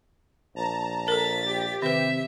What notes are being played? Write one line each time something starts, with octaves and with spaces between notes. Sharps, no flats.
A#1 A5 A#5
A4 A#4 A6 B6
G4
C3 D#3 B4 E5